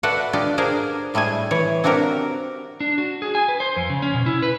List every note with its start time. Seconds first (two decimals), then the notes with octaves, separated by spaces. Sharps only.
0.03 F#4 A4 B4 D5 E5 F#5
0.33 D4 F4 G4 D5 D#5
0.58 D4 F4 G#4 A#4 C5 D5
1.14 A2 G3 A3 G#4 G#5
1.51 E3 C#5
1.84 C4 D4 F#4 G4 A#4
2.80 D4
2.98 F#4
3.22 G#4
3.35 G#5
3.49 B4
3.60 C5
3.77 F2
3.90 C#3
4.02 C#4
4.14 B2
4.26 E4
4.42 B4